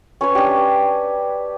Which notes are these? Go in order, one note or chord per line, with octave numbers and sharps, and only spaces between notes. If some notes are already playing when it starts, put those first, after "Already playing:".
C#4 B4 C#5
D4 G4